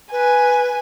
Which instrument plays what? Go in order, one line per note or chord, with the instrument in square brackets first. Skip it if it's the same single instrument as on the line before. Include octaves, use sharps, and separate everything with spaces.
[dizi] B4 [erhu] G#5